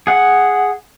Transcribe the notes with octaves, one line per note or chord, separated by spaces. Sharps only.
G#4 F#5